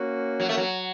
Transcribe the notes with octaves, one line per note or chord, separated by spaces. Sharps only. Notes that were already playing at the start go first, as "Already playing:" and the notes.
Already playing: A#3 C#4 F#4
F#3
A3
F#3